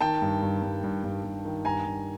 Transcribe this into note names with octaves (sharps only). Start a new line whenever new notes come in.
D#3 G5 A5
G2
G2
G2
G2
G2
G2
D#3
G2 G#5 A#5
G2